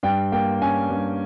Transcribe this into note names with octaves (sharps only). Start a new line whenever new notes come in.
G2 G5
A#3 G5
C#4 G#5
G2